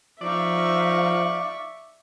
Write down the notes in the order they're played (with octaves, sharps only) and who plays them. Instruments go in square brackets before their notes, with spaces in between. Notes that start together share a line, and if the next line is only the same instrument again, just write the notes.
[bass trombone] F3 [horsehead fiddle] D#4 F5 [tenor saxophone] D5 [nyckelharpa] E5 C#6